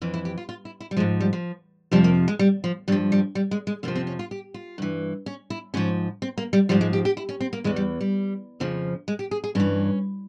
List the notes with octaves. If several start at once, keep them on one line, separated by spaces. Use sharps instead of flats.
F2 E3
E4
G4
F4
F4
E4
E4
G3
G#2 F3 G#3
G3
F3
F2 C3 F3 G3
A#3
G#3
G3
F3
G2 F3 G3
G3
G3
G#3
G#3
F2 C3 F3 A#3
C4
C#4
F4
G4
F4
G2 E3
C#4
E4
G#2 F3 C#4
C4
A#3
G3
G#2 F3 G3
G#3
G4
G4
E4
C#4
C4
A#3
E2 E3 G#3
G3
G3
F2 C#3 F3
G#3
G4
G#4
G#4
G2 E3 C#4